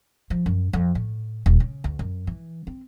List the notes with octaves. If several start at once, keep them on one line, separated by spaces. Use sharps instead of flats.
F3
F#2
F2
A2
D#1
C#3
D2
F#2
E3
C4